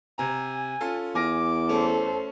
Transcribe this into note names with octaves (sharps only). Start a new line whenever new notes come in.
C3 G#5 A#5
C#4 F4 A4
E2 G#5 D6 F6 A#6
A3 C#4 A4 C5